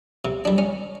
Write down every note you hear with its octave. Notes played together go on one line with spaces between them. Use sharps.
C3
G3 D4
C#4